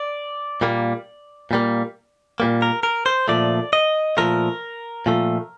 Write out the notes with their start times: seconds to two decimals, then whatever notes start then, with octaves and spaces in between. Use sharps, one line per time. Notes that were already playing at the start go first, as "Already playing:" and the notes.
Already playing: D5
0.61 A#2 G3 A#3
1.51 A#2 G3 A#3
2.40 A#2 G3 A#3
2.62 A#4
2.83 A#4
3.06 C5
3.28 A#2 F3 A3 D5
3.73 D#5
4.17 A#2 F3 A3 A#4
5.06 A#2 F3 A3